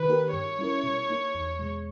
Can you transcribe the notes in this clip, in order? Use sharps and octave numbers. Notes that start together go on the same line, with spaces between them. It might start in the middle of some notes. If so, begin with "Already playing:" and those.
Already playing: D#3 B4
A#3 D#4 G4 A#4
G2 C#5
G3 C#4 E4 A#4
B2
A#3 D#4
E2
B2 G#3